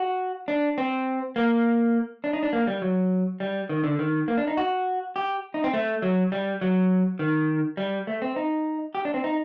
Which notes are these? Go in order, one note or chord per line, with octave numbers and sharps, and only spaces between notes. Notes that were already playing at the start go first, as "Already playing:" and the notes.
Already playing: F#4
D4
C4
A#3
D4
D#4
D4
A#3
G3
F#3
G3
D#3
D3
D#3
A#3
D4
D#4
F#4
G4
D#4
C4
A3
F#3
G3
F#3
D#3
G3
A3
C4
D#4
G4
D4
C4
D#4